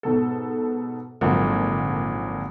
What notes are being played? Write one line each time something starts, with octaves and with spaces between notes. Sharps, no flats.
G#2 B2 A4
G#1 A#2 D3 F3 F#3